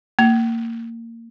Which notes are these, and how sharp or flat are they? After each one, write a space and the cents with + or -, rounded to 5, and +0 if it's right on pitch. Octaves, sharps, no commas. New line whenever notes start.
A#3 -20